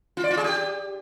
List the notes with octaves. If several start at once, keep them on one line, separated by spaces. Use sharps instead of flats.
F4
D5
F4
G#4
G4